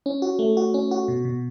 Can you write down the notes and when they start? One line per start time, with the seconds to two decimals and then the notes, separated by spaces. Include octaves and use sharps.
0.06 C#4
0.22 F#4
0.39 A3
0.57 F#4
0.74 C#4
0.91 F#4
1.08 B2
1.25 B2